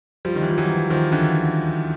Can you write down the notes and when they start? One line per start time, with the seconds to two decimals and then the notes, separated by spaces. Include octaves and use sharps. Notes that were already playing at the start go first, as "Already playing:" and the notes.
0.25 F3 G3
0.35 D#3
0.42 E3
0.50 F3
0.58 E3 F#3
0.90 D#3 F3
1.12 D3 E3